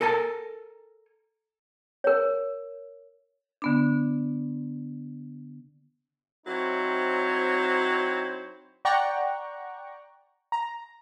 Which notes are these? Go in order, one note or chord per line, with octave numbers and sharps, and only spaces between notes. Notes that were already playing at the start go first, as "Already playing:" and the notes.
A4 A#4 G#5 A5
A#4 C#5
D3 B3 D4
F#3 C4 D#4 E4 C5 C#5
D5 F#5 G5 A#5 C#6
A#5